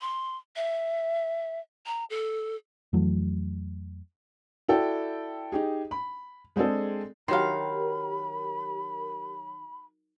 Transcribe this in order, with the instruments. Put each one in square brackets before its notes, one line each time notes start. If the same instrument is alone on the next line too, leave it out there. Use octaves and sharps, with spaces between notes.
[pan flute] C6
E5
A#5
A4
[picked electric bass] F2 E3 F#3 A3
[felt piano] E4 F#4 A4 D5 G5
D#4 G4 G#4
B5
G#3 C4 D4 G#4 A4
[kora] D#3 F#3 [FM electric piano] G4 A#4 [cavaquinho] F5 C6 [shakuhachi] B5